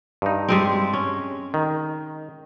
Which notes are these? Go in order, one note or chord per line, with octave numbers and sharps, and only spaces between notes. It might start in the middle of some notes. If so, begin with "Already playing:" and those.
G2 D#4
G3 G#3 C4
C#4
D#3